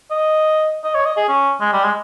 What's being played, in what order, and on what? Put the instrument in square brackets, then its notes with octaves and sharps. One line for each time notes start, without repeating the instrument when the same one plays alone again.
[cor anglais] D#5
D#5
C#5
D#5
G#4
C#4
G#3
G3
G#3